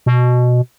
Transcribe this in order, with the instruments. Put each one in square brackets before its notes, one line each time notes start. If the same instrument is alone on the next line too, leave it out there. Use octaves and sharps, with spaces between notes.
[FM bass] B2